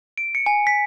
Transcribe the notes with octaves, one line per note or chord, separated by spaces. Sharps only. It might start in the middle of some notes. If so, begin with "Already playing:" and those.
D7
C#7
G#5
B6